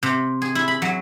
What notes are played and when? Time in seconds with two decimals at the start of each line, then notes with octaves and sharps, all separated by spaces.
0.03 C3
0.42 G#4
0.55 E4
0.68 B5
0.82 F#3